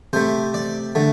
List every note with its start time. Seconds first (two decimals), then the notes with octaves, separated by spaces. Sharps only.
0.13 C3 A3 C5
0.54 D5
0.95 D3 A3